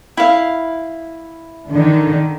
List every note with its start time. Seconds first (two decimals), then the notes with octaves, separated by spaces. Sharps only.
0.17 E4 F5
1.70 D3 D#3